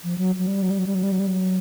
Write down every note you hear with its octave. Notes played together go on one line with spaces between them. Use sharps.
F3
F#3
F#3
G3
F#3
G3
F#3
G3
F#3
G3
F#3
G3
F#3